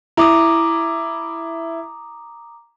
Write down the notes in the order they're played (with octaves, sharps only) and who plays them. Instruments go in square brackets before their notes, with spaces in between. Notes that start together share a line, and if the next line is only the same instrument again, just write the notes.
[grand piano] E4 [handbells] A#5 D6 D#6